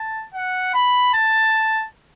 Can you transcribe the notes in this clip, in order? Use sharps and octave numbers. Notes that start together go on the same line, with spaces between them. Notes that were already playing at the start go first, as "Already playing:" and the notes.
Already playing: A5
F#5
B5
A5